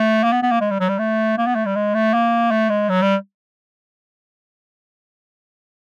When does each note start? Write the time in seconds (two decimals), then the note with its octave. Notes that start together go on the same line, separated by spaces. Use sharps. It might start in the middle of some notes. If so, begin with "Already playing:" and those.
Already playing: A3
0.24 A#3
0.32 B3
0.43 B3
0.51 A#3
0.60 G#3
0.71 G3
0.80 F#3
0.89 G3
0.99 A3
1.38 A#3
1.47 B3
1.55 A3
1.66 G3
1.75 G#3
1.94 A3
2.14 A#3
2.51 A3
2.69 G#3
2.89 F#3
3.02 G3